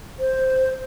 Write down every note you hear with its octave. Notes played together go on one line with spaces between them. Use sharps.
C5